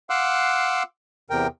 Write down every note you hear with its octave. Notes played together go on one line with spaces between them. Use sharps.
F5 F#5 C6 D6 E6 F#6
E2 C3 A#4 G5